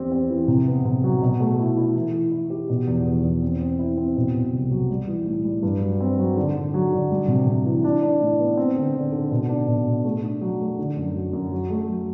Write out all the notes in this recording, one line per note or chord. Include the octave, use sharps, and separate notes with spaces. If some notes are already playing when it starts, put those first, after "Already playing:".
Already playing: E2 C4 G4
C4
E3
C3
B3
C3
F#3
B2
A3
E4
E4
E3
E3
E4
G4
B2
E2
E2
E2
C4
C4
E4
C4
B2
B2
C2
F#3
G3
E3
A2
G3
G2
F#3
C4
F#3
D3
D3
F#3
D3
G3
C3
C3
E3
D4
D4
A2
B3
C4
D3
D3
D3
B2
D4
B2
B2
A3
D4
F#3
A3
D3
F#2
F#3
F#2
F#3
A3
F#3